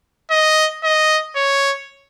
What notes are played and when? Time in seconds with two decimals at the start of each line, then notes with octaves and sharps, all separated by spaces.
0.31 D#5
0.84 D#5
1.36 C#5